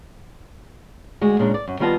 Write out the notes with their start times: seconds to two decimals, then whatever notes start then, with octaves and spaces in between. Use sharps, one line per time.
1.21 D2 G#3 F#4
1.39 A#2 C#3 G#3 D4
1.54 D5
1.68 F#2
1.80 D#3 G3 B3 F4 D#5 A5